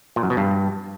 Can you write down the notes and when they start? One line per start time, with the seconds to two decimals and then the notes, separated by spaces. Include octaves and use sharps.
0.16 A#2
0.23 F#2
0.30 B2
0.37 G2